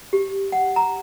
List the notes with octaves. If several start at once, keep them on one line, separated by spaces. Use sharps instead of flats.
G4
F#5
A#5